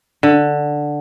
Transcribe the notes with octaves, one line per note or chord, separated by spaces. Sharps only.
D3